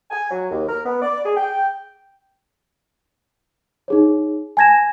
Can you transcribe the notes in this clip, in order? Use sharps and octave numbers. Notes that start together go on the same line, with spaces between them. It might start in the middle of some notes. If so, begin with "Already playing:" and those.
G#5
F#3
D#2
A#4
B3
D5
G#4
G5
D#4 G#4 C#5
G#5 A5 G#6 A#6 E7